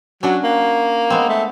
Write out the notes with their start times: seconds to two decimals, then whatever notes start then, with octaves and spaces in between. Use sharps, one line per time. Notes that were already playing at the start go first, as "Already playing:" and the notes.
0.23 F#3 C#4 D4 F#4
0.44 A#3
1.10 G#3 B3 C4
1.29 A3